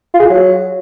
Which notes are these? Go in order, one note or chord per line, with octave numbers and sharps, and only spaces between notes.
F4
G#4
F4
F#3